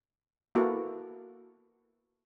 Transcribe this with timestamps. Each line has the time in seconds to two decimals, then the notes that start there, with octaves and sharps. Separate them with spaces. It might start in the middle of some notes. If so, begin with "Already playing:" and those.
0.55 A#3 B3 E4 F#4 A4 A#4